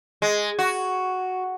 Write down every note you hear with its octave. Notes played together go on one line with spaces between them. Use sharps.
G#3
F#4